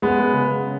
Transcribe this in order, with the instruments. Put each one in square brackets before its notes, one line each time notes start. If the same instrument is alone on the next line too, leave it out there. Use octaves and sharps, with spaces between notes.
[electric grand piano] F#2 [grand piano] G#3 B3
[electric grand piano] C#3